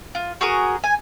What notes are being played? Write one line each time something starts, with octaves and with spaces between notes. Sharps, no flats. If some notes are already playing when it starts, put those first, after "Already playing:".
F4
F#4 G#4 A#4 D#6
G#5